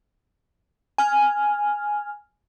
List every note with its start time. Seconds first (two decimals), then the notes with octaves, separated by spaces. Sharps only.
0.98 G#5 F6